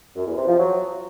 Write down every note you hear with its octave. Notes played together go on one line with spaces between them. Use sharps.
F#2
E2
C3
F3
F#3